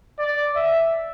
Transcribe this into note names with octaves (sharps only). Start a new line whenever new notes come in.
D5
E5